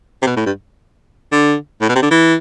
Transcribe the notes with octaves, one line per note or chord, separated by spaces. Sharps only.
C3
B2
A2
G2
D3
A2
B2
C3
D3
E3